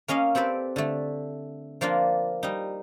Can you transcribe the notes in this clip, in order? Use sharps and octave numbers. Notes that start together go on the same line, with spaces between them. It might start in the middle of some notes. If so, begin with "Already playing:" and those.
A#3 C#4 D#5 F5
C4 G4 A4 B4 D5
D3 A3
F3 A#3 D4 F4
G3 D#4